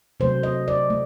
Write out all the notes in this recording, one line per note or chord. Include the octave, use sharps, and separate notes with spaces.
C3 F#3 A3 C5
D#5
D5
A3